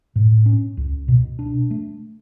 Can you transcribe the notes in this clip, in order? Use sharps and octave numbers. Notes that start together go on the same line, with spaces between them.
A2
C#4
C#2
B2
D4
A3